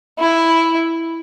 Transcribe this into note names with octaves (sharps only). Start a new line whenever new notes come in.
E4